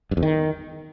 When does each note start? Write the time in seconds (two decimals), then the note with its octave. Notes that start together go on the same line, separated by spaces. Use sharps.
0.11 G2
0.17 E2
0.23 D#3